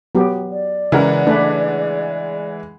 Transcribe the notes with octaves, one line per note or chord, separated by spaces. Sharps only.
F#3 B3 G4
D5
C#3 E3 G#3 A#4 F#5
A3 D4 B4